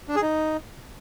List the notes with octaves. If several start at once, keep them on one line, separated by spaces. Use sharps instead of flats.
D4
G#4
D#4